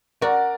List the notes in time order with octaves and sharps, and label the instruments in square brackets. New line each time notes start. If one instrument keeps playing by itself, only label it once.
[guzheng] F#4 [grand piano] A#4 D5